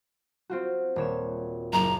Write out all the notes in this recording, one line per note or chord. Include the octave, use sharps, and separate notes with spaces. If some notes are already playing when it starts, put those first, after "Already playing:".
C4 F4 F#4
D#1 C#5 E7
F#1 A#5